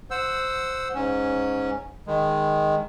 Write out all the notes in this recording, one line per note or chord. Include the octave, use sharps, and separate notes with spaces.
C5 F#5 E6
G#2 C#4
D#3 G#3